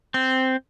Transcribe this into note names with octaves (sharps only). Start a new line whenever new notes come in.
C4